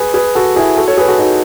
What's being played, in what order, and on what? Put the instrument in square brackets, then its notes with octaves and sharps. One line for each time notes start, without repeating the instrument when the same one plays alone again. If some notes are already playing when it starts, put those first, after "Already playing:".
Already playing: [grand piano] G#4 B4
G#4 B4
F#4 A4
E4 G#4
F#4 A4
A4 C#5
G#4 B4
F#4 A4
D#4 F#4